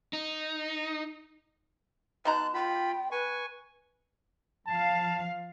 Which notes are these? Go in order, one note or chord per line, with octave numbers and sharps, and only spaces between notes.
D#4
B2 D#4 A5 A#5 C6 F#6
F4 G5 B5
B4 G#5 C#6
F3 F5 A5